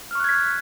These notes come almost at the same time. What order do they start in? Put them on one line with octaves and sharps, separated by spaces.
F6 C#6 F#6 G#6 B6